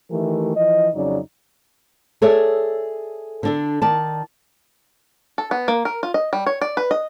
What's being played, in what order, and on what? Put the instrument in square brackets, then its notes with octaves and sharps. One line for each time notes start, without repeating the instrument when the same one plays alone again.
[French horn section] D#3 E3 A3 G4 A#4
E3 F3 D#5
F2 C#3 F#3 D#4 D5
[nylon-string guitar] G#4 A4 C#5 D5 E5
D3 D4 A4
D#3 D5 A5
[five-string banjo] A4
B3
A#3
A#4
F4
D#5
G3
C#5
D5
B4
D#5